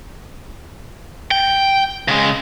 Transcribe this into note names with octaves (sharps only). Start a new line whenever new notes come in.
G5
C#3 G#3